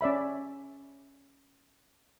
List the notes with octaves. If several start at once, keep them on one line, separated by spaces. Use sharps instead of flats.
C#4 D5 E5 B5